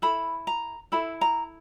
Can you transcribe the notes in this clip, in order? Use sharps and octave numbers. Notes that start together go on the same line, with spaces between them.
E4 A4 B5
A#5
E4 A4 B5
A#5